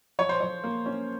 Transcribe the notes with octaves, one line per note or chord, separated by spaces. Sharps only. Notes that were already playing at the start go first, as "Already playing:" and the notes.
F3 C#5
C5
F3 C#5
A#3
C#4